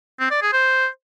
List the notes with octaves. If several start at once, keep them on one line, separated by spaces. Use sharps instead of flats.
C4
D5
G#4
C5